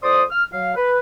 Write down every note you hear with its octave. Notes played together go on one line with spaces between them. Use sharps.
F2 C5 D5 C6 D#6
F6
F#3 F5
B4